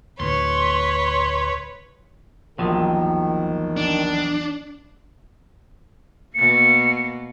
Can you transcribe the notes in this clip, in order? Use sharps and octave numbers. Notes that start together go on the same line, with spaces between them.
D2 A2 B4 C#5 C6
A#1 E2 D#3 F3 F#3
D4
B2 A#3 C#7